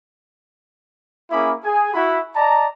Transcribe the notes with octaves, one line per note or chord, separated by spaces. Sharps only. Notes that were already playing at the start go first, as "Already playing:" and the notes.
A#3 C#4 E4 G#4 B5 D6
G#4 G#5
E4 F#4 B5
D5 D#5 A5 A#5